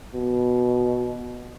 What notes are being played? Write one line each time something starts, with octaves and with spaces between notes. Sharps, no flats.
B2